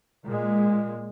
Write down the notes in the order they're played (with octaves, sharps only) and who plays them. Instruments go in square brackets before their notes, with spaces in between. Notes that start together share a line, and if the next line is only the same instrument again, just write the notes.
[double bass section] A#2 G#3